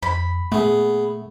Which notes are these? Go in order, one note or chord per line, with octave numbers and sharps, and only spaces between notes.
F2 B5
A#2 A3 B3 G#4